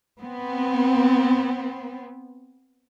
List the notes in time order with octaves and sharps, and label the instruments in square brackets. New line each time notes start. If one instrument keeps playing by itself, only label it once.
[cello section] B3 C4